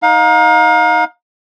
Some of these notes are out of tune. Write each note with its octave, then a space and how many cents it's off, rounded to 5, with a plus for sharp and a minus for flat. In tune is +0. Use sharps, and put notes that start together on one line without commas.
D#4 +10 F5 +35